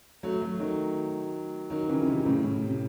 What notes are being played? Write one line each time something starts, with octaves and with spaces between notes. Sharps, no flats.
F#3 A3
F#3 A3
D#3 F#3
D#3 F#3
C#3 E3
C#3
C3 D#3
A2 C#3
A2
C3